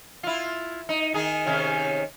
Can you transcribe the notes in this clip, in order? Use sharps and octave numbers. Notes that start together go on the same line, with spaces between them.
E4 F4
D#4
D#3 D#4 G#4
C3 D#3 C#4